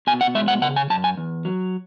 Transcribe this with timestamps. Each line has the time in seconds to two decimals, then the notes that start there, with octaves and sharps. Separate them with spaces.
0.07 B2 G#5
0.21 F#5
0.35 G#3 E5
0.48 F#5
0.62 C#3 F#5
0.76 G#5
0.90 F#2 A5
1.04 G#5
1.17 E2
1.45 F#3